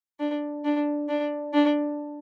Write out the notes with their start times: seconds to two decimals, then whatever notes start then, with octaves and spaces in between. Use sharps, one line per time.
0.20 D4
0.65 D4
1.09 D4
1.54 D4